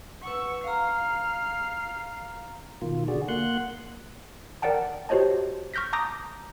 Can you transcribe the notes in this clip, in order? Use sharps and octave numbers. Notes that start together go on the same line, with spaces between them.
B4 F#5 C#6 E6
F5 A#5 F6 C7
B2 D#3 F4
D3 F#4 G#4 D5
A#3 F#5 C6 F#6
A#4 D5 F#5 G5 A5
F#4 G4 C5 C#5 D#5 A5
C#6 F6 G6 A#6 B6
A5 A#5 D6 D#6 G6 A#6